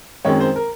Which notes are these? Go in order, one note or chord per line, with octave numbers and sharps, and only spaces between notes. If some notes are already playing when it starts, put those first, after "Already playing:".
F#2 D#3 G#3 C4 C#5
C5
A#4